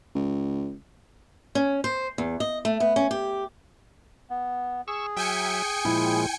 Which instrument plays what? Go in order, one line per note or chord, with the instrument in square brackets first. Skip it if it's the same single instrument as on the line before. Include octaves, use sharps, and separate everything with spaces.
[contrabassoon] C#2
[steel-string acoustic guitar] C#4
C5
E2
D#5
A3
B3
C#4
G4
[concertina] B3
[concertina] G#4 [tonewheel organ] C#6 E6
[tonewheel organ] F#3 E5 [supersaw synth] G5 G#5 C#7
[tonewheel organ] A#2 F3 G#3 [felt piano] E4